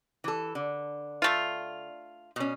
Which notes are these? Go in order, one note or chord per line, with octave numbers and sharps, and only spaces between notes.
E3 A4
D3
A3 F4
B2 C#4